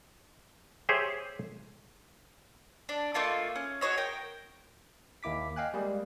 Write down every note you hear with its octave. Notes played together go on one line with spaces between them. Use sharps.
G4 G#4 C5 C#5 E5
D4
A3 A#3 F4 D#5
C#4
F#4 G#4 C#5 D#5
A#4 G5
D#2 A#3 E4 D6 B6
D#5 F5 G5 G#5 F#6
G3 G#3 A#3 G4 G#4